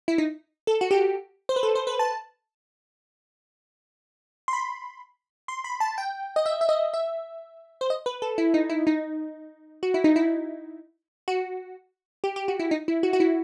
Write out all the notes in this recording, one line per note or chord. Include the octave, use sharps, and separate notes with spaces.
E4
D#4
A4
F#4
G4
C5
B4
A4
C5
B4
A5
C6
B5
C6
B5
A5
G5
D#5
E5
E5
D#5
E5
C5
D#5
B4
A4
E4
D#4
E4
D#4
F#4
E4
D#4
E4
F#4
G4
G4
F#4
E4
D#4
E4
F#4
F#4
E4